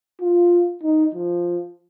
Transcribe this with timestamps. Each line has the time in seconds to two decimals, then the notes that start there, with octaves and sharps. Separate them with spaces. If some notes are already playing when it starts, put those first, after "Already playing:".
0.21 F4
0.83 D#4
1.14 F3